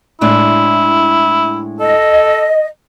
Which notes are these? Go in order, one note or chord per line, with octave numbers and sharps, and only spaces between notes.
A2 G#3 D4 E4
A4 D#5